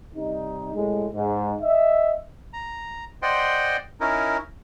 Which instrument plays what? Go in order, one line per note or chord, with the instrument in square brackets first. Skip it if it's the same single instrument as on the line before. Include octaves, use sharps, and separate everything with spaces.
[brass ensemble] C3 G3 D#4
A2 C3 G#3
G#2
D#5 E5
[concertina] A#5
C5 D5 D#5 F#5 G5 C6
C#4 D#4 E4 A#4